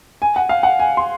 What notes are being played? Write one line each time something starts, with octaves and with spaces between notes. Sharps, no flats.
G#5
F#5
F5
F#5
G#5
C6